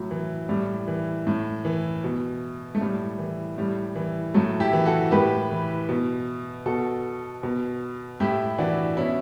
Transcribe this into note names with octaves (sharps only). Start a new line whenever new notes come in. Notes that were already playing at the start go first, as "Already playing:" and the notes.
Already playing: A2 F#3
E3
A2 G3
E3
A2
E3
B2
A3
A2 G3
E3
A2 G3
E3
A2 F#3 A3
E4 G4
E3
F#4 A4
A2 G4 B4
E3
B2
B2 F#4 A4
B2
A2 E4 G4
E3 D4 F#4
B2 C#4 E4